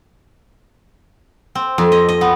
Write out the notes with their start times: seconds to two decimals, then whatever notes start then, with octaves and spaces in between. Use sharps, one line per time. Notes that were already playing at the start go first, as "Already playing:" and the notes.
1.55 C4
1.78 F2
1.92 D#5
2.09 D#5
2.21 B3